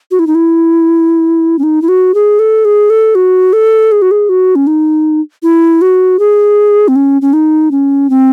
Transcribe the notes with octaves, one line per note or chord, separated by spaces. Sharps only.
F#4
E4
D#4
E4
C#4
D#4
E4
F#4
G#4
A4
G#4
A4
F#4
A4
G#4
F#4
G#4
F#4
C#4
D#4
E4
F#4
G#4
C4
C#4
C#4
D#4
C#4
C4